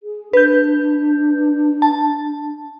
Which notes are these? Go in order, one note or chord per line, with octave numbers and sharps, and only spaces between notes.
G#4
D4 B4 G6
A5